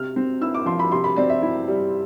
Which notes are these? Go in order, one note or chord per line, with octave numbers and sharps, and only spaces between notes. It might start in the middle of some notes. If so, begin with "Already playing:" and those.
Already playing: C3 F6
C4
E4 E6
D6
F3 C6
B5
C3 C6
B5
C4 D5
E5
E4
G3